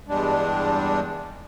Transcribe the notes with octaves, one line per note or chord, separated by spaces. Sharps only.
E2 G2 G3 G#3 D4